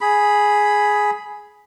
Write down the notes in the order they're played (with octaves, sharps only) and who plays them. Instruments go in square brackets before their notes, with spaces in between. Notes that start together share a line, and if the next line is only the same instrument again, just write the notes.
[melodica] G#4 B5